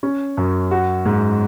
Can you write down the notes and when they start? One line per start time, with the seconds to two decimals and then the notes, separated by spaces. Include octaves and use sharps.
0.03 C#4
0.37 F#2
0.71 F#4
1.06 G#2